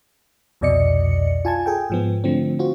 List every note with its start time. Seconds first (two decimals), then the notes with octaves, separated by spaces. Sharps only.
0.61 C2 F2 B2 D5 D#5 C#7
1.45 F4 G#5 A5 G#6
1.66 G#4 A4 G5
1.90 G#2 F3 B3
2.24 D3 F3 A3 C4
2.59 C4 F4 F#4